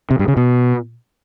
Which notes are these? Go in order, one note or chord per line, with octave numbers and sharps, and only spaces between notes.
C3
G2
C#3
B2